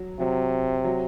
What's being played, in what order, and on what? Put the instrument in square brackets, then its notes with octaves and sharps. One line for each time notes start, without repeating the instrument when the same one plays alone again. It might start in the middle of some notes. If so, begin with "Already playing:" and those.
Already playing: [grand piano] F#3
[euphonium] C3 [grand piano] F#3
[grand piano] F#3